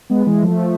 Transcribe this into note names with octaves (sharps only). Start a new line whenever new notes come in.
G#3 B3
E3 G#3
F3 A3